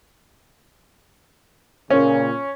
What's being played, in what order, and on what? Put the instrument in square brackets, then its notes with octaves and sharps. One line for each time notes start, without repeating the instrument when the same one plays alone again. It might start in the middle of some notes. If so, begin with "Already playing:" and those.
[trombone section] A#2 C#3 [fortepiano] C#4